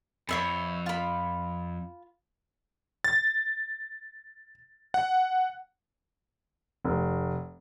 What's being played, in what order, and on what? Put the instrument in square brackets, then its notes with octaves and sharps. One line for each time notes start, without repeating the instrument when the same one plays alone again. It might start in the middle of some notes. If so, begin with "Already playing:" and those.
[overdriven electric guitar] F2 [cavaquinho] C#5 E5 B5
[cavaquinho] F4 B5
[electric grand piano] A6
F#5
[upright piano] F1